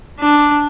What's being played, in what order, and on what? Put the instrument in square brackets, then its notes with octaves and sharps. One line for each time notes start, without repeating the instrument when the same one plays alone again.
[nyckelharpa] D4